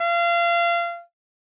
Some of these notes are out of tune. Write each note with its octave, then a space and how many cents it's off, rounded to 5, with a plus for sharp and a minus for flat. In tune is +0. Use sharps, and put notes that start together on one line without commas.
F5 -30